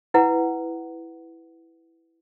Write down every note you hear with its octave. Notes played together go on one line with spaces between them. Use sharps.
E4 B4 F#5